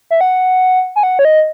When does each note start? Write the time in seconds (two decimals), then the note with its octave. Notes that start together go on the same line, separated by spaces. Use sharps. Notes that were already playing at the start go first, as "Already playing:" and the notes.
0.11 E5
0.21 F#5
0.96 G#5
1.03 F#5
1.19 C#5
1.25 D#5